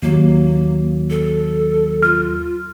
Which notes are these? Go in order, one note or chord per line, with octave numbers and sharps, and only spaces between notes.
D#2 F#3 A#3
A4
F4 F6